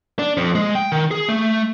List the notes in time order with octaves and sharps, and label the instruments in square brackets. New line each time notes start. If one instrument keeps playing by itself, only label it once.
[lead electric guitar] D4
F2
G#3
G5
D#3
G#4
A3